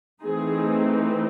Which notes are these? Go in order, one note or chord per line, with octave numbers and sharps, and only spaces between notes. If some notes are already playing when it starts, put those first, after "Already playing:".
E3 A3 C4 D#4 G#4